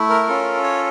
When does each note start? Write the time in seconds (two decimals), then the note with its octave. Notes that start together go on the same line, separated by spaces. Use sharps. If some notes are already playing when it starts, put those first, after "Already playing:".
Already playing: A3 E4
0.10 A#4
0.27 C#4 F4 A4
0.63 C#5